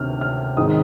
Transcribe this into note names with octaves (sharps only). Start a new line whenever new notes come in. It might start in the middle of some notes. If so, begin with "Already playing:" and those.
Already playing: D2 C3 D#3 F6
F6
G#1 G#2 D#3 D#6